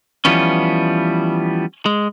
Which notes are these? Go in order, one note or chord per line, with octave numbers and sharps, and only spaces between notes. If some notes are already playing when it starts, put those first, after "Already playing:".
E3 F3 G3 B3 C#4
G#3